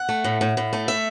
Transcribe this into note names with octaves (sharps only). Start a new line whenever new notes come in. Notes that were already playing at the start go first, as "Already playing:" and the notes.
Already playing: F#5
A3
A2
A2
A2
A3
E5